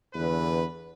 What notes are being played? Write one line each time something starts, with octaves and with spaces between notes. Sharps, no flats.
E2 D3 B4